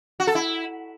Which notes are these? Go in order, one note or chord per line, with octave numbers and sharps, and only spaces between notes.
F#4
A4
E4